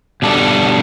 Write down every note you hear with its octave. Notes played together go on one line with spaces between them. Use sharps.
B2 G3 D4 A4